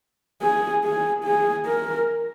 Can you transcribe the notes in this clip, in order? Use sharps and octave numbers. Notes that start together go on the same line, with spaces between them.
G#4
G#4
G#4
A#4